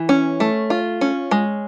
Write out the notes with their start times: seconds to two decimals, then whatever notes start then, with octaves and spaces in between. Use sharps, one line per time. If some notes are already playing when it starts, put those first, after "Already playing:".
Already playing: E3
0.09 C#4
0.40 A3
0.70 F4
1.01 C#4
1.31 G#3